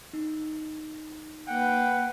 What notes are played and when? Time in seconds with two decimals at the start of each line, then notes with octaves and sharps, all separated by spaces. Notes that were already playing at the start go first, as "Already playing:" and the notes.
0.13 D#4
1.48 A#3 B4 F#5 G5